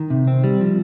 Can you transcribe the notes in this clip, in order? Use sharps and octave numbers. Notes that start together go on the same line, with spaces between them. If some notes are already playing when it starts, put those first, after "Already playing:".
Already playing: D#3
C3
C4
G3
F3